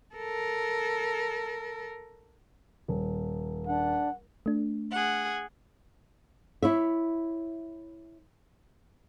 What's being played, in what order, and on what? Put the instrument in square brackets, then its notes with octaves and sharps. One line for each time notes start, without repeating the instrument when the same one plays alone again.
[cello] A4 A#4
[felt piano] D#1
[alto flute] D4 [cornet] F#5
[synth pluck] A3 D4
[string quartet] G#4 F#5
[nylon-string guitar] E4 C#5 E5